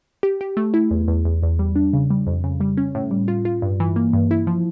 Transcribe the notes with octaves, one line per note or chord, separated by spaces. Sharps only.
G4
G4
A3
E4
E2
E2
E2
E2
G3
D4
C#3
G3
F2
C#3
G3
C#4
A2
G3
F4
F4
G2
E3
A#3
G2
E4
F3